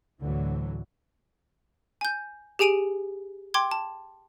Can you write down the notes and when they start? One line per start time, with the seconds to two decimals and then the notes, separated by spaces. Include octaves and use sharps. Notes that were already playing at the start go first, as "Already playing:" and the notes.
0.21 D2 A2 D3 E3 F#3
2.01 G#5 G6
2.59 G4 G#4 G#5 D7 D#7 F7
3.54 G5 C6 D6 G#6
3.71 A5